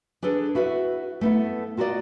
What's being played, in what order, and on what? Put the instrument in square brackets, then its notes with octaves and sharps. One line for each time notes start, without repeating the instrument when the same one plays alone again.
[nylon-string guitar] D4 G#4 A4 B4
E4 F#4 B4 E5
A3 B3 E4
F4 F#4 A#4 B4 D5 D#5